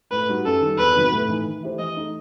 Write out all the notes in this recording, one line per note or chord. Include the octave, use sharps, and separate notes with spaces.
A2 B4
G3 D#4 F#4
F#2 A4
D#3
G3
E2 B4
C3 D#3 F#3
A2
E3 A3 D#4
D#3
A3 E4 G4 C5
E3 D#5
A3 D#4 A4